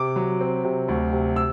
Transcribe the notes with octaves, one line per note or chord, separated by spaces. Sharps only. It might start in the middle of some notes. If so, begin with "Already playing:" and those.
Already playing: C3 D6
F#3
C4
C3
D2
C3
E6